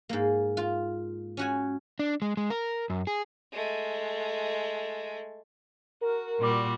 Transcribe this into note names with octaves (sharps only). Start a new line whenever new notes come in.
G#2 A#3
F4
C#4 F#4 G#5
D4
G#3
G#3
A#4
F#2
G#4
G#3 A3
F#4 A#4
A#2 G3 F#4 C6 D6